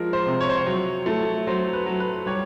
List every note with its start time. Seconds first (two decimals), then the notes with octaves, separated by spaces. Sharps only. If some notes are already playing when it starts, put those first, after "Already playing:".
Already playing: F3 G#3 A#4
0.13 C5
0.26 C3
0.40 C#5
0.49 C5
0.57 C#5
0.66 F#3
1.06 A3
1.47 F#3 C5
1.73 B4
1.86 F#3
2.00 B4
2.26 G3 C#5